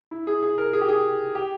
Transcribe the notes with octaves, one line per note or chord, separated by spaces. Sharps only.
E4
G#4
G#4
A#4
G#4
G4
G#4
G4